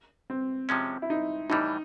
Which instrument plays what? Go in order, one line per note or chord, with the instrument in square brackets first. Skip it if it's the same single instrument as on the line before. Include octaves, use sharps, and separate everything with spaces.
[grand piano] C4
[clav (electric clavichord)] C3 F3 G#3 C#4
[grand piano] E4
D#4
[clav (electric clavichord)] A2 E3 G3 [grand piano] D#4